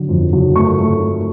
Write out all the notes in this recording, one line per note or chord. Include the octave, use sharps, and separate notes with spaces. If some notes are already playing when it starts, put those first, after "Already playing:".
Already playing: D3 F#3
F2
F#3
A3 C#6
A3